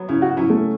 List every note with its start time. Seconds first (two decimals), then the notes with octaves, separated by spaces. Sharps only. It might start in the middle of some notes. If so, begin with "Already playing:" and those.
Already playing: F#3 B3
0.08 C#3 E4
0.22 F#4
0.37 F#3 C#4 E4
0.50 A3